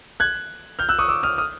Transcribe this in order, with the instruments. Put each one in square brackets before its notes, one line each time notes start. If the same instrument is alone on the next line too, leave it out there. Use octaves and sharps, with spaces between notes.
[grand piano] F#6 G#6
F6 G6
E6 F#6
C#6 D#6
D6 E6
D#6 F6
D#6 F6